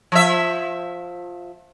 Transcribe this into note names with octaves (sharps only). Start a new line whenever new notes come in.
F3 E5